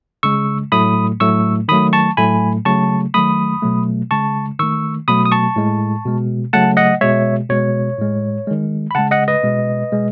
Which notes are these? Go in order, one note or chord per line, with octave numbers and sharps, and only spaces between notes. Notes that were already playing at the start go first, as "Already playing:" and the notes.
C#3 G#3 C#6 E6
A2 F#3 A3 B5 D#6
A2 F#3 A3 C#6 E6
D#3 F#3 A3 B5 D#6
A5 C#6
A2 F#3 A3 G#5 B5
C#3 F#3 A3 A5 C#6
D#3 F#3 A3 B5 D#6
B2 F#3 A3
C#3 G#3 A5 C#6
D#3 A3 C#6 E6
B2 F#3 A3 B5 D#6
D#6
A5 C#6
A2 G#3
B2 G#3
C#3 F#3 A3 F#5 A5
D#5 F#5
B2 G#3 C#5 E5
B2 G#3 C#5
A2 G#3
D#3 G#3
B5
C#3 G#3 F#5 A5
D#5 F#5
B4 D#5
B2 G#3
B2 G#3